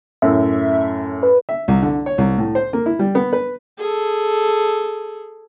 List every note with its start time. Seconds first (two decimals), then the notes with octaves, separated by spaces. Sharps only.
0.22 F#2 A2 E5
1.23 B4
1.49 E5
1.68 C2
1.82 D3
2.06 C#5
2.18 C2
2.38 A2
2.55 C5
2.73 A#3
2.86 E4
2.99 G3
3.15 B3
3.33 B4
3.78 G#4 A4